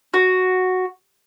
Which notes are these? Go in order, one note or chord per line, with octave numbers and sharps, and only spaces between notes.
F#4